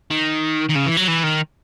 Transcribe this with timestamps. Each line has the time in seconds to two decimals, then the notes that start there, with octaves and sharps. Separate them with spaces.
0.11 D#3
0.69 D#3
0.75 C#3
0.86 E3
0.97 F#3
1.08 E3
1.23 D#3